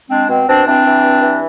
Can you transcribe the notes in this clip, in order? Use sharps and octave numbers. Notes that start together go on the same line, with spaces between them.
G#3 C4 D4
B2 C4
B2 C4 D4
E3 C4 D4
E3
G2
E3